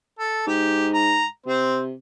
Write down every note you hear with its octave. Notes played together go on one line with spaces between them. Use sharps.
A4
G#2 G4
A#5
C3 C4 C5